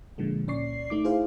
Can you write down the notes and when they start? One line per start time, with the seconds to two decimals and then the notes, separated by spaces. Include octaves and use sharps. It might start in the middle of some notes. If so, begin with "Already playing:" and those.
0.18 A#2 D3 F3 G#3
0.47 C#2 A#2 C#4 D5 C#6 C7
0.90 A3 D#4 D6
1.04 E4 G#4 C5 F5